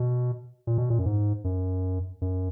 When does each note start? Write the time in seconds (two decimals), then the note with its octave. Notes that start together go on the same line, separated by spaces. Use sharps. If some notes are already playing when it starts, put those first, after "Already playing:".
Already playing: B2
0.67 A#2
0.78 B2
0.90 A#2
0.99 F#2
1.06 G#2
1.44 F#2
2.21 F#2